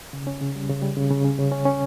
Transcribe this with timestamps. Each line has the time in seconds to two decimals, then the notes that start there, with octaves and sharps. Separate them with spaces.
0.13 C#3
0.27 C#4
0.42 C#3
0.55 G3
0.69 C#3
0.82 G3
0.97 C#3
1.10 C#3
1.25 C#4
1.39 C#3
1.52 C#4
1.65 C#4